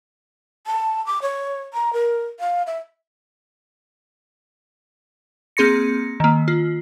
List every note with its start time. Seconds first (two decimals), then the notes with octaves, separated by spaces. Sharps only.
0.67 A5
1.07 D6
1.22 C#5
1.73 A#5
1.93 A#4
2.40 F5
2.67 E5
5.57 A#3 C4 G#4 C6 A#6 C#7
6.20 D#3 A#3
6.48 F4